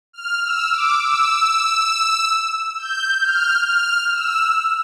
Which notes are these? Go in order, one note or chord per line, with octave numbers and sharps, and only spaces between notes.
F6
E6
D6
E6
G6
F6
F6
E6